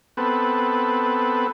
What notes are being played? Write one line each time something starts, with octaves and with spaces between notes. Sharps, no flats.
B3 C4 A4 B4